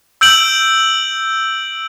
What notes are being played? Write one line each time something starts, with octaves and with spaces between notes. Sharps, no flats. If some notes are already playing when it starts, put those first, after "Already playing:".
E6 G6 D7 F#7